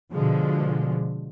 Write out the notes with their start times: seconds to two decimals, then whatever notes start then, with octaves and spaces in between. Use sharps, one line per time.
0.14 B2 D3 F3 G#3